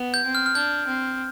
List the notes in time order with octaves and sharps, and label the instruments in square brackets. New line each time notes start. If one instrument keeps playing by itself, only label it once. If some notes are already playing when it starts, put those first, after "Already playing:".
Already playing: [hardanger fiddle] B3
[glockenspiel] G6
[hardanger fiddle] C4
[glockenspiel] F6
F6
[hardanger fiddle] D4 [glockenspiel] G6
[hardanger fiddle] C4